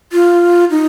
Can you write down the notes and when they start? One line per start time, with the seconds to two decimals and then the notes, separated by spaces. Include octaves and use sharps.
0.13 F4
0.71 D#4